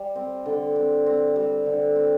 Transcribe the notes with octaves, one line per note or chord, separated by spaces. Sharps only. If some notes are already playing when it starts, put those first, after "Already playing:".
Already playing: G3
C4
D3
C4
C4
G3
D3
C4